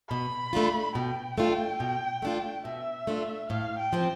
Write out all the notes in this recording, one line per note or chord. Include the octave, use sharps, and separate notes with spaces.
B2 B5
A3 D4 F4
B2 G5
A3 D4 F4
B2
A3 D4 F4
B2 E5
A3 D4 F4
A2 F5
G5
F3 C4